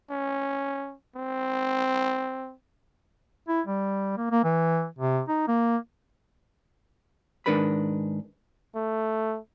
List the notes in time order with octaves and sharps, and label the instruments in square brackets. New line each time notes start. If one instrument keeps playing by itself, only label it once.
[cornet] C#4
C4
[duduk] E4
G3
A#3
A#3
E3
C3
D#4
A#3
[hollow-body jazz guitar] G#2 D#3 D4 A#4 B4 B5
[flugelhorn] A3